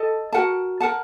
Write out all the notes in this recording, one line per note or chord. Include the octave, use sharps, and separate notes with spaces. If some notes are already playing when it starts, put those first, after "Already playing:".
Already playing: A4 D#5 A5
F#4 A#4 F#5 A5
A#4 F#5 A5